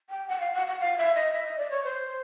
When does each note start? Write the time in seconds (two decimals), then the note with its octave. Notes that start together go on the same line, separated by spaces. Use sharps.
0.10 G5
0.28 F#5
0.40 F5
0.54 F#5
0.67 F#5
0.80 F5
0.97 E5
1.15 D#5
1.32 E5
1.45 D#5
1.58 D5
1.71 C#5
1.84 C5